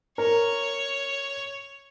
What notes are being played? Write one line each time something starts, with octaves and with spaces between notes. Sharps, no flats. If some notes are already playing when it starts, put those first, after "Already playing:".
A#4 C#5